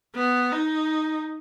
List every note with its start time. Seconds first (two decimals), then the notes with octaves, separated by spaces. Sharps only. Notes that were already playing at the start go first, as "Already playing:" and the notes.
0.15 B3
0.52 D#4